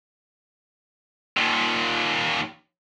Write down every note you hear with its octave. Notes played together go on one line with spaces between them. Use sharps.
D#2 A#2